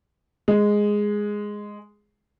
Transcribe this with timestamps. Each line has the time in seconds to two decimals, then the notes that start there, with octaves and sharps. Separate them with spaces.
0.48 G#3